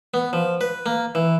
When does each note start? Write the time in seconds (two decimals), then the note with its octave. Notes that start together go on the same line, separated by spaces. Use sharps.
0.14 B3
0.33 F3
0.61 B4
0.86 A#3
1.15 E3